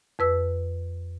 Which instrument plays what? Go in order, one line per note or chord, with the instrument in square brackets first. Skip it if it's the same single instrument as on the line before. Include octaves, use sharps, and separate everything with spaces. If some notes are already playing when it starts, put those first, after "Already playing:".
[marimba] F2 B4 E6